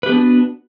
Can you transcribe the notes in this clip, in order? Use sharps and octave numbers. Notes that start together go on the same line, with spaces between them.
B3 D4 F#4 G4 B4